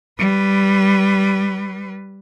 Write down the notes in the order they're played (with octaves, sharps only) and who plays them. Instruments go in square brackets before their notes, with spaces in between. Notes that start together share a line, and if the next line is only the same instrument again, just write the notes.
[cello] G3 B4